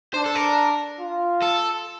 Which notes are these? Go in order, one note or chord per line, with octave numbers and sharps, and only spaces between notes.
D4 C5
A4
A#4
F4
A4